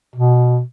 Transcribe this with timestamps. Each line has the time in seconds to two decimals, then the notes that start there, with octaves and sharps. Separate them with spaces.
0.16 B2